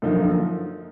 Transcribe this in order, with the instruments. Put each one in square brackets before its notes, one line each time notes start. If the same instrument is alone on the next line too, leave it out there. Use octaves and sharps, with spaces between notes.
[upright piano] F#2 D3 F3 A#3 D#4